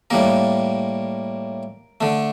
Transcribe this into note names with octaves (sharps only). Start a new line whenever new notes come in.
A2 G3 A#3 A#4
D3 A3